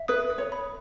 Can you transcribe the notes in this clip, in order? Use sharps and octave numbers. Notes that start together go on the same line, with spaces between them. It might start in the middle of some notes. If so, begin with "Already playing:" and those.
Already playing: E5
B4 D#6
D#6
C#5
B5